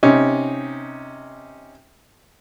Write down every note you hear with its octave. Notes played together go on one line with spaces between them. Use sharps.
C3 C#4 D#4